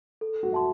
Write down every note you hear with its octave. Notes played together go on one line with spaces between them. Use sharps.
A4
F#4
E5 A5 C6